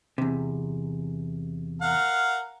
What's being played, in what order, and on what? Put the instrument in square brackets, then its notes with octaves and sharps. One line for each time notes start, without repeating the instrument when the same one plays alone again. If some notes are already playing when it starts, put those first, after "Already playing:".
[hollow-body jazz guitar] E2 C3
[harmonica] A#4 F5 F#5